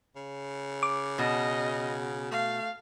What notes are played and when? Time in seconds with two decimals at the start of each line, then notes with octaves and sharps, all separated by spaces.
0.16 C#3
0.83 D6
1.19 B2 D#5
2.31 A3 F5